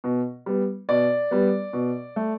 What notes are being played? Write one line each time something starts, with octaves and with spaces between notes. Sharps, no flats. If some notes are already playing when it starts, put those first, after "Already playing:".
B2
G3 B3
B2 D5
G3 B3
B2
A3